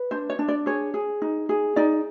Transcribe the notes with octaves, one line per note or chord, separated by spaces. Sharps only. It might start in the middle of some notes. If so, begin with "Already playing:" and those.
Already playing: B4
D4 C5
C#5
D4
D5
G#4 C#5
G#4
D#4
G#4
D#4 D5